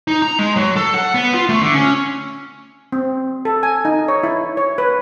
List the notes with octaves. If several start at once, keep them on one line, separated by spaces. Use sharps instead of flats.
D#4
A#5
G#3
F#3
A4
F#5
B3
F4
A3
D3
C#4
C4
A4
G#5
D#4
C#5
E4
C#5
B4